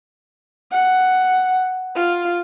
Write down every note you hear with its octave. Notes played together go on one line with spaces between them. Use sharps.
F#5
F4